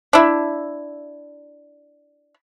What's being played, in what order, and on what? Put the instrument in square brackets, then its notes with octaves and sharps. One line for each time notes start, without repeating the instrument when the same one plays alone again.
[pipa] D4 E4